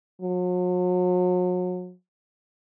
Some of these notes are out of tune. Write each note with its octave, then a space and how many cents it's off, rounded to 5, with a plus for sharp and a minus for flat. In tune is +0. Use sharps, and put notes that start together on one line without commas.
F#3 -40